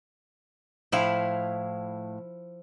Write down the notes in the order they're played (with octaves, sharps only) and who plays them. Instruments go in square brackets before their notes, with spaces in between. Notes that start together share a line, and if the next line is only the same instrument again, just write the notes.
[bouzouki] A2 F5 [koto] F3 E4